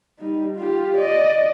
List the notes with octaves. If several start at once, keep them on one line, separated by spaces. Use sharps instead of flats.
G3 D#4
F4 G4
D5 D#5